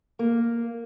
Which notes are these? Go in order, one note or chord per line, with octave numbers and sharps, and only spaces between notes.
A#3